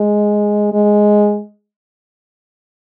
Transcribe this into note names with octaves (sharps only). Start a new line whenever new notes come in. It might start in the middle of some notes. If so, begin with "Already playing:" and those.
Already playing: G#3
G#3